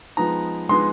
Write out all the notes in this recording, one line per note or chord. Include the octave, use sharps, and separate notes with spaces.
F3 G#3 B3 D#4 A#5
F3 G#3 B3 D#4 C6